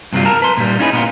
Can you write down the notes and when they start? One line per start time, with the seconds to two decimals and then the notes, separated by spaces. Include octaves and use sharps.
0.13 G2 C3 F#3 G3 F4
0.26 A#4 A5 A#5
0.42 B4 C6
0.57 A#2 G3
0.79 C#4 D#4 E4 G#4 A4 B4
0.93 A#2 B3 F4